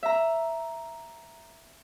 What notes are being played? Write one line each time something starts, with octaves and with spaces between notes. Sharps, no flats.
E5 A#5